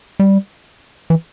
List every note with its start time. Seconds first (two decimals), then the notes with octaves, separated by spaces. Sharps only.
0.19 G3
1.10 E3